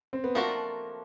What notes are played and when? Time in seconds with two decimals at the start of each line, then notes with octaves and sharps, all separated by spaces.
0.13 C4
0.24 B3
0.35 F3 A3 A#3 D4 F#4 A#4